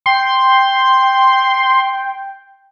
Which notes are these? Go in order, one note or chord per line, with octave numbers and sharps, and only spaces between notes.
G5 C6